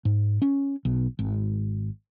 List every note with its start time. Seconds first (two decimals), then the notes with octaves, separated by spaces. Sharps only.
0.05 G#2
0.42 C#4
0.85 B1
1.19 G#1